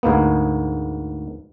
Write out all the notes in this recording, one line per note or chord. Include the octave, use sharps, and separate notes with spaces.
D2 G#2 A#3 B3